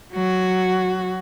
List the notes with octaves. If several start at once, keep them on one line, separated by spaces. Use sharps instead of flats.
F#3 F#4